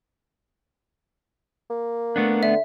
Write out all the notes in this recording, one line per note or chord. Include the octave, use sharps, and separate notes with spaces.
A#3
A3 B3 D4
D3 E5